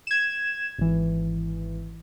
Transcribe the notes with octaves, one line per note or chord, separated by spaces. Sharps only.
G#6 E7
G#1 E3